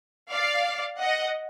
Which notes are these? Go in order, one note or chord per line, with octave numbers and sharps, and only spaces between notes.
D5 F5
D#5 F#5